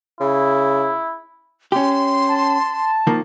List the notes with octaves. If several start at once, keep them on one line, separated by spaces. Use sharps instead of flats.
C#3 E4
C#4 G4 C6
A5
D#3 F3 A#3